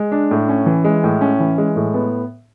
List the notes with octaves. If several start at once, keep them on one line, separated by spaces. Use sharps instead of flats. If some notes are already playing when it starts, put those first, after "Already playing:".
Already playing: G#3
D4
A2
C#4
E3
G#3
A2
C#4
E3
G#3
A2
B3